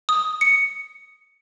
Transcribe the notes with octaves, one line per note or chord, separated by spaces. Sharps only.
D#6
C#7